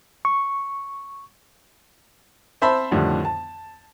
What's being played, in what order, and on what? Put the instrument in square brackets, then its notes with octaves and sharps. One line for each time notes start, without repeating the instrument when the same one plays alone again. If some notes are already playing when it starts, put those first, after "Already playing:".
[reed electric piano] C#6
[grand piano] C4 C5 E5 A5 B5
F2 A2 D3 D#3 G3 D4
A5